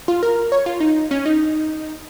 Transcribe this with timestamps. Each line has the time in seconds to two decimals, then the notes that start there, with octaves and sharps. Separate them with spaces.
0.08 F4
0.23 A#4
0.52 C#5
0.66 F4
0.80 D#4
1.11 C#4
1.26 D#4